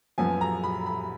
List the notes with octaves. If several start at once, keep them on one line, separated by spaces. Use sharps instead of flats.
F#2 F3 B3 G#5
A#5
B5
B5